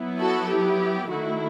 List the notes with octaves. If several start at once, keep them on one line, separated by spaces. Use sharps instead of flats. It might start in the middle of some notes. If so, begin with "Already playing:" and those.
Already playing: F#3 B3 E4
F#4 A4
G4
D#3 A3 E4 F#4